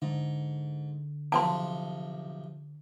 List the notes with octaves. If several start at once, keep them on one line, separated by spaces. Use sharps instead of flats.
G#2 D3
B1 C3 F3 A5 C6